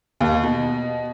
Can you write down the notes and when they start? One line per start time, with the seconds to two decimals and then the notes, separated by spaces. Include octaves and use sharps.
0.21 D#2
0.43 B2